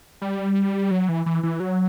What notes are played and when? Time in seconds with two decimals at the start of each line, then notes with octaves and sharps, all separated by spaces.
0.22 G3
0.91 F#3
1.09 E3
1.26 E3
1.43 E3
1.60 F#3